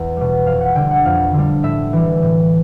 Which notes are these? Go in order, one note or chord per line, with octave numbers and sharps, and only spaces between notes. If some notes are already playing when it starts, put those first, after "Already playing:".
Already playing: E2
B2 G3
F2 F5
F#5
D3 G3 G5
F#5
F2 F5
D3 G3
A2 E5
E3 G3
A2